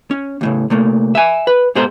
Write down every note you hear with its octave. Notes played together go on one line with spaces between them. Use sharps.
C#4
D#2 A2 C#3
C3 A3 A#3
E5 G#5
B4
G#2 B2 G#4 A4 C5 A#5